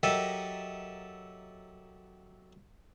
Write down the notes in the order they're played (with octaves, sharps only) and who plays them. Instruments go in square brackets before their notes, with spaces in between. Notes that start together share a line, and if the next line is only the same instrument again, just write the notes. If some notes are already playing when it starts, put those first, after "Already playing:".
[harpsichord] F#3 G4 A4 A#4 D#5 E5